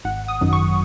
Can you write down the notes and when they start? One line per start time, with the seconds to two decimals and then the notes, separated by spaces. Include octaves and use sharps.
0.05 G#1 F#5
0.28 D#6
0.41 F#2 D#3 F#3
0.53 C#6